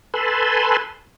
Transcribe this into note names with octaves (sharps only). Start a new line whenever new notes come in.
A4 B4 G#5 A5 B5 C6